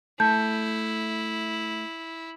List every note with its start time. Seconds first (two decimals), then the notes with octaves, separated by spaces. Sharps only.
0.20 A3 E4 A5 G6